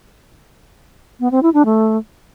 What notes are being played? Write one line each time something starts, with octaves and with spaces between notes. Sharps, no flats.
B3
C4
E4
D4
A3